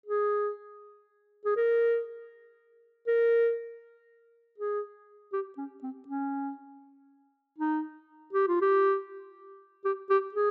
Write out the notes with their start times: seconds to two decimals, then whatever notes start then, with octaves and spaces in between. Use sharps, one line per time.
0.06 G#4
1.45 G#4
1.57 A#4
3.07 A#4
4.58 G#4
5.33 G4
5.58 C#4
5.83 C4
6.08 C#4
7.59 D#4
8.33 G4
8.48 F4
8.61 G4
9.85 G4
10.10 G4
10.34 G#4